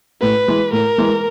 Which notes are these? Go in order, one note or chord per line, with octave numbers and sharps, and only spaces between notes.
A2 B4
E3 G#3
A2 A#4
E3 G#3